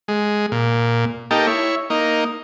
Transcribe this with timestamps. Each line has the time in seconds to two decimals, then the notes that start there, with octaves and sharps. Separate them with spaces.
0.08 G#3
0.52 A#2
1.31 A#3 D#4 G4 A4
1.47 E4 C#5
1.90 A#3 D#4